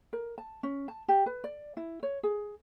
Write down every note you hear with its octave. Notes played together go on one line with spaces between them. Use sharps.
A#4
A5
C#4
A5
G4
B4
D5
E4
C#5
G#4